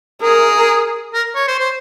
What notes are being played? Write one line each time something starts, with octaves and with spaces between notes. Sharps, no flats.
G#4 A#4
A#4
C#5
C5
C5